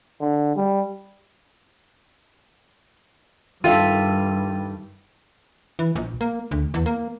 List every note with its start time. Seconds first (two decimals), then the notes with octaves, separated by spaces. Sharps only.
0.20 D3
0.56 G3
3.64 G2 D#3 F4 A4 E5 G5 A6 D#7
5.79 E3
5.95 A#1
6.21 A#3
6.51 D2
6.74 E2
6.86 A#3